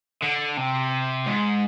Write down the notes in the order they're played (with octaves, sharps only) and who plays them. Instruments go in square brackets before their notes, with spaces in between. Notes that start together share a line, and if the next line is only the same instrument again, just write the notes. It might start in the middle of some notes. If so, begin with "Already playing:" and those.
[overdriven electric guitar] D3
C3
G#2